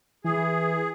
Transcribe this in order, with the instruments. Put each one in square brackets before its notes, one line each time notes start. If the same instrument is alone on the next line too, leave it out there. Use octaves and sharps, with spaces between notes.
[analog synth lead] E3 [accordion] G#4